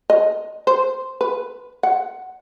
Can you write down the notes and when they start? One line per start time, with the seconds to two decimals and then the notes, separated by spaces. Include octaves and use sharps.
0.10 D#5
0.67 C5
1.21 B4
1.83 F#5